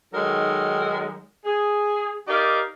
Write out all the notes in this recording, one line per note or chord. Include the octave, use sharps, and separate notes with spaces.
D#3 F#3 G#3 D#4 A4 A#4
G#4
D#4 G4 A#4 D5 D#5 F5